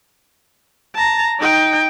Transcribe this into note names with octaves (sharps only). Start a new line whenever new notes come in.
A5 A#5
D#4 G5